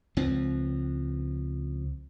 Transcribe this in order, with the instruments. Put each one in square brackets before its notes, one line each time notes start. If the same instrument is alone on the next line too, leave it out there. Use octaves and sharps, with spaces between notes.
[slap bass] C#2 F3 C4